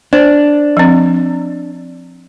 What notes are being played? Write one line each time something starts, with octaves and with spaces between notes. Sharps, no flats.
D4 C5
F3 C4